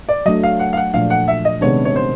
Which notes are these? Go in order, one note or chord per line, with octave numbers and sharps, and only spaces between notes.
D5
F#3 A3 D4 D#5
F5
F#5
F5
F#5
A#2 F3 A3 D4 F5
F#5
E5
D#5
C3 D#3 G#3 B3 D4 C#5
C#5
C5